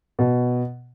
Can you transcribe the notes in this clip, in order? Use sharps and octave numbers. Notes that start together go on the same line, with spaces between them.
B2